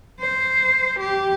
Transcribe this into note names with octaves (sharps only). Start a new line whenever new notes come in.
C5
G4